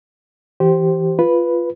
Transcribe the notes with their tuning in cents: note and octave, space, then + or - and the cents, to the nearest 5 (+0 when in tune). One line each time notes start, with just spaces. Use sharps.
E3 +0 G4 -15 C5 +0
F4 -10 B4 +0